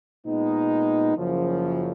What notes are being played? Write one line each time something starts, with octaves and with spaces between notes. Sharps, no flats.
A#2 G#3 B3 D#4
F#1 F#2 C#3 F3